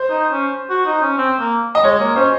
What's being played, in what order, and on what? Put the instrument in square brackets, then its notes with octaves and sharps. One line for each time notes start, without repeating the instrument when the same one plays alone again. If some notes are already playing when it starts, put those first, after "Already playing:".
Already playing: [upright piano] C5
[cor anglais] D#4
C#4
F#4
D#4
C#4
C4
A#3
[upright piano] D#5
[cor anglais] G#3 [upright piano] C#5
[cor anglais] A#3
[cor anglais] C#4 [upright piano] C5